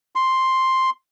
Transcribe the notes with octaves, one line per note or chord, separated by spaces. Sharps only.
C6